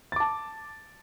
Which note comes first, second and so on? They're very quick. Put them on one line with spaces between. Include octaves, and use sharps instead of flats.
A6 D6 A5